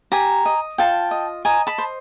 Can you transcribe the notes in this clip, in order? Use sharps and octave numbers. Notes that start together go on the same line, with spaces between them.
G4 G#5 A#5
D#5
F4 G5 A5
D#5
D#5 G#5 A#5
A5 B5
C5